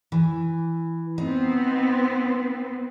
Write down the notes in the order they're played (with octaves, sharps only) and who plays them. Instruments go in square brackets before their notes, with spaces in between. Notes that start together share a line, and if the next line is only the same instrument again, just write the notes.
[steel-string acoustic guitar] E3
[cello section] B3 C4 [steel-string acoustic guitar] D#4